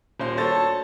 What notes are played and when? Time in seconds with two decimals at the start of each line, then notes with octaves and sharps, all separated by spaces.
0.20 D#1 C5 C6
0.37 D2 F#4 A4 C5 C#5 A5 A6